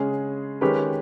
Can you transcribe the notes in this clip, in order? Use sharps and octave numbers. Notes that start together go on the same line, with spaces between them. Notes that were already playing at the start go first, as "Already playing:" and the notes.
Already playing: C#3 G#3 C#4 G#4
D#3 G#3 C#4 G4 B4